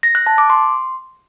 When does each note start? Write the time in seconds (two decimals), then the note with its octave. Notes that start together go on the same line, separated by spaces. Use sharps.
0.03 A#6
0.15 F#6
0.27 A5
0.38 D6
0.50 C6